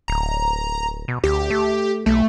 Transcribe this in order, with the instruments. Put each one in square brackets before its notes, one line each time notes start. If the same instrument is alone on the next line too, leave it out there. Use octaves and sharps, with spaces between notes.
[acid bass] D1 [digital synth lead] A#5
[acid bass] B2
[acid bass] D2 [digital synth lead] G4
[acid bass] A3
[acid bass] B1 [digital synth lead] A3